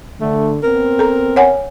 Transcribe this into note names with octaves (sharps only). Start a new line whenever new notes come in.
D3 A3
B3 C4 A#4
A4 A#5
C#5 F#5 G#5